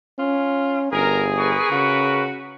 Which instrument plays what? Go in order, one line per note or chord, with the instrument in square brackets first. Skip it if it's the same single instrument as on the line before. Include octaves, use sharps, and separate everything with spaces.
[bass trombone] C#4 [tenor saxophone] F4
[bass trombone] G1 [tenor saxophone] G#4 [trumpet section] A#4
[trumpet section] A#4 B4 C#6
[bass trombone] C#3 [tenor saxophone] F#4